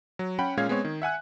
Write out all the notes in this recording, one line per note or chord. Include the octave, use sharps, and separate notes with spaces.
F#3
C#4 F#5 G5 B5
A#2 G#3 C#4 F5 G#6
G#3 B3 C4 C#5
D#3
E5 F#5 G#5 F#6